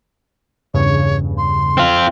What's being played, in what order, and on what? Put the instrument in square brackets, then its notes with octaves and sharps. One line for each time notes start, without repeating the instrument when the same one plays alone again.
[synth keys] E2 G2 C#3 [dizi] C#5
[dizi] C6
[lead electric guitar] C4 F4